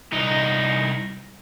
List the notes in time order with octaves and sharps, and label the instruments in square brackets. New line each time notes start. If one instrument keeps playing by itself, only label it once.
[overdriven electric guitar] C2 D#4